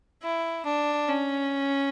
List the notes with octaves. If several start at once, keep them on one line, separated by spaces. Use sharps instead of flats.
E4
D4
C#4